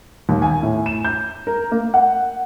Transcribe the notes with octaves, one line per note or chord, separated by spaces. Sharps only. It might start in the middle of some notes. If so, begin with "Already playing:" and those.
D#2
G#5
A2
E7
G6
A#4
A#3
F#5